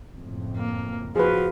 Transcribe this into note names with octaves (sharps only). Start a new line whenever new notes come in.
F#1 F2 A2
A#3
F3 F#4 G#4 B4